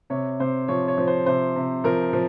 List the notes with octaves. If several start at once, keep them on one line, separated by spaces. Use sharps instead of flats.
C3 C#5
C3 C5
F3 C#5
C#5
F3
C5
C3 C5
C3
F3 A#4
F3